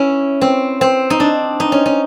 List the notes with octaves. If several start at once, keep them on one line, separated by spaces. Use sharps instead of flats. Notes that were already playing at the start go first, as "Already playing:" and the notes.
Already playing: C#4 E4
C4
C4
D#4
D4
D#4
C#4
C#4